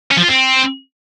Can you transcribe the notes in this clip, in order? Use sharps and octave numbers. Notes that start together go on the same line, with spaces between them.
C#4
F3
F4
C4